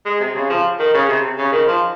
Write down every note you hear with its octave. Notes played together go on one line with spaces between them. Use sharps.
G#3
C3
C#3
F3
D#3
C#3
C3
C#3
D#3
F3